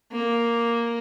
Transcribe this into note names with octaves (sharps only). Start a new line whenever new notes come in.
A#3